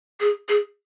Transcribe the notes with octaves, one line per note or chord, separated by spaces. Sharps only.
G#4
G#4